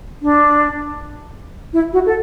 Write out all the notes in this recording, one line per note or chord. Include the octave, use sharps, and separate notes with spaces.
D4
E4
F#4
A4